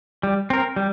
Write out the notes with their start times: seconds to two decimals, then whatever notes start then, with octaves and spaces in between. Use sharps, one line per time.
0.23 G3
0.50 C4 A#4
0.76 G3